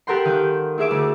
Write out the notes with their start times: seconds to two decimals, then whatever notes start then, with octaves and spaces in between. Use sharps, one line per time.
0.07 G4 A4 A#4 F#5 G5 C6
0.25 D#3 F5 F#6 G6
0.78 E4 G#4 E5 D6
0.91 D2